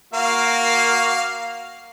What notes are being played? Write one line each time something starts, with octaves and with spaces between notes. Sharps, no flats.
A#3 F#4 F5